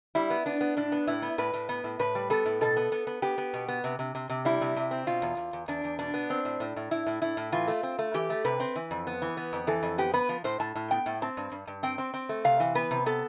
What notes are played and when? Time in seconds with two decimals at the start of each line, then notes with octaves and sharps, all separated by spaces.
0.15 G3 E4
0.30 B3
0.46 B3 D4
0.61 B3
0.77 A2 D4
0.92 B3
1.07 A2 E4
1.22 B3
1.38 A2 B4
1.54 A2
1.69 B3
1.84 A2
1.99 A2 B4
2.15 G3
2.30 B3 A4
2.46 A2
2.61 B2 A4
2.77 B3
2.92 B3
3.07 B3
3.22 B3 G4
3.38 B3
3.53 B2
3.68 B3
3.84 C3
3.99 C3
4.15 C3
4.29 C3
4.45 G3 E4
4.61 C3
4.76 C3
4.91 C4
5.07 B2 F4
5.22 E2
5.37 E2
5.53 E2
5.68 E2 D4
5.84 E2
5.99 B2 D4
6.14 B3
6.30 C4
6.45 A2
6.60 A2
6.76 A2
6.91 A2 E4
7.07 A2
7.22 A2 E4
7.37 A2
7.52 E3 F4
7.68 A3
7.83 C4
7.99 A3
8.14 E3 G4
8.30 A3
8.45 C3 B4
8.60 C4
8.76 E3
8.91 F2
9.07 B3
9.22 E3
9.37 B3
9.53 F2
9.67 E3 A4
9.83 F2
9.98 B3 G4
10.14 B3 B4
10.29 F3
10.44 A2 C5
10.60 A2 A5
10.75 A2
10.91 B3 G5
11.06 A2
11.22 C4 A5
11.37 G2
11.52 G2
11.67 G2
11.83 C4 G5
11.98 C4
12.14 C4
12.29 A3
12.44 C3 F5
12.60 E3
12.75 B3 B4
12.91 C3
13.06 B3 A4